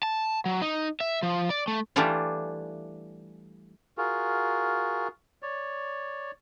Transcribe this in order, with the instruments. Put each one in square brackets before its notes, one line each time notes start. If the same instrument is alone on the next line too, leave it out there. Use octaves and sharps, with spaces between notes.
[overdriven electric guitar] A5
F#3
D#4
E5
F3
D5
A3
[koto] E3 G3 A3 D4 E4 F4
[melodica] F4 F#4 G#4 A#4
C#5 D5